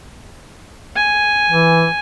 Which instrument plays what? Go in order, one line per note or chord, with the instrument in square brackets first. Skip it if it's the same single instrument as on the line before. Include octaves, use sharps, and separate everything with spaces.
[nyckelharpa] G#5
[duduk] E3